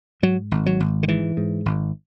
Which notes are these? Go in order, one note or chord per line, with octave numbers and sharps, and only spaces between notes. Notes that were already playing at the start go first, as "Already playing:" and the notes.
G#2 F#3
G#1
F#3
G#1
D3
G#2 E3
G#2
G#1